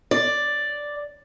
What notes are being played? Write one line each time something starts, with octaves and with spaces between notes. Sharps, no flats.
D5